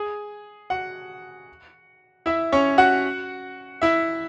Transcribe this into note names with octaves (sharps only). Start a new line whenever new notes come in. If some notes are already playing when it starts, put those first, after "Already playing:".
Already playing: G#4 G#5
F#4 F#5
E4 E5
C#4 C#5
F#4 F#5
E4 E5